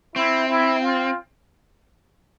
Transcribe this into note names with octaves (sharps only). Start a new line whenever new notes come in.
C4 E4
E4
F4